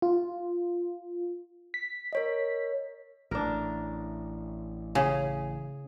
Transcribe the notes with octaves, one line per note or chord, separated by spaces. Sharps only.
F4
B6
A#4 C#5 D#5
A1 D4 A#4
C#3 G#4